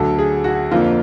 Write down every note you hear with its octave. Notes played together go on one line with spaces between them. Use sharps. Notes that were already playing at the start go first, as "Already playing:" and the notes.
Already playing: D2 D3 F#3 A4
G#4
F#4
F2 D3 F3 A#3 F4